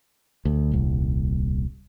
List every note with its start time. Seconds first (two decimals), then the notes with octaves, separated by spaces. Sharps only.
0.45 D2
0.72 D#1 C2